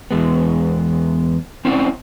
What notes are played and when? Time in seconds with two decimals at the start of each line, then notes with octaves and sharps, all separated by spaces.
0.11 E2 G#3 B3
1.65 C4 C#4 E4 C5 D5 F#5